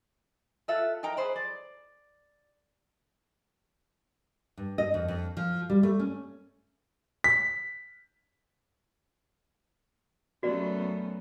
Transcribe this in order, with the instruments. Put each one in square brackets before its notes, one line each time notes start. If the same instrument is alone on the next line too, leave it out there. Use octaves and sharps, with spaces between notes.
[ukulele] F4 A4 E5 F#5
D#4 A#4 G5 A#5
G#4 B4 C5 B5
D5
[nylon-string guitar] G2
D#5
F2
F2
F3
G3
A3
C#4
[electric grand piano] B6
[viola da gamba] F#2 A3 B3 [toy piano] F#4 D5